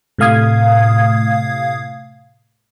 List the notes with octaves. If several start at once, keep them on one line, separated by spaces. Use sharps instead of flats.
A2 C3 A3 F5 D#6 G#6